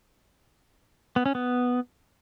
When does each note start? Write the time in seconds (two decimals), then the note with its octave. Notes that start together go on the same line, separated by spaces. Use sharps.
1.16 B3
1.26 C#4
1.35 B3